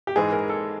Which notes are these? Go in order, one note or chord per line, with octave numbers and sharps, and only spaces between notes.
G4
G#2 E3 G#3 G#4
A#4
A4